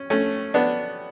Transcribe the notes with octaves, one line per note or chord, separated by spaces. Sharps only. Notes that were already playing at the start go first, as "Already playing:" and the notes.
Already playing: C#4
A3 C#4
B3 D4